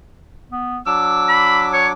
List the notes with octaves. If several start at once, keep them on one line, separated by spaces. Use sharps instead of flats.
B3
F#3 D4 D6 E6
B5
C#5